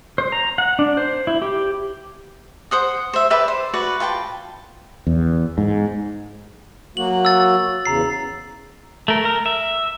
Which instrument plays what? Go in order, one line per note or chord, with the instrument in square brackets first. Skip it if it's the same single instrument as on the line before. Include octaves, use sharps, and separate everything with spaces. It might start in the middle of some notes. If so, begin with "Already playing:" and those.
[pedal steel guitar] C5
A#5
F#5
D4
C5
E4
G4
[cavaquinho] C5 F#5 D#6
C5 E5
B4 D5 E5 G5
C5
F#4 B4 D5
F4 B4 G5 A5
[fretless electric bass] E2
G#2
[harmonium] F#3 A#3 F#4 [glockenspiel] F#7
[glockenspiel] E6 A6
[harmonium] E2 C#3 [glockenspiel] A#5 C7
[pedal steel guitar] A3 A#4
A#4
E5